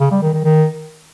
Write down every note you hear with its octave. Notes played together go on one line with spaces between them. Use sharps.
C#3
G3
D#3
D#3
D#3